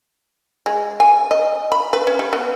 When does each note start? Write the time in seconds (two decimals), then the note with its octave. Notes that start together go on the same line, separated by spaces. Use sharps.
0.66 G#3
1.00 G#5
1.31 D#5
1.72 B5
1.93 B4
2.07 C#4
2.19 G3
2.33 B3